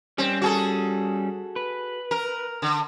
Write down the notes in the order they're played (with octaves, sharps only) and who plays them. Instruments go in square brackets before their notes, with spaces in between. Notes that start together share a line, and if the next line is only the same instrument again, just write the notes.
[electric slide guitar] G3 C#4 [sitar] C4
[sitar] F#4 G#4 A4
[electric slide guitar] B4
[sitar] A#4
D3